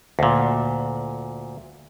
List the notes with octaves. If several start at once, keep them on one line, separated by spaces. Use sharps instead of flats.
D2 A#2